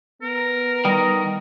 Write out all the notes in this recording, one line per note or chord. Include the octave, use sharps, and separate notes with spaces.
B3 A#4
D#3 G3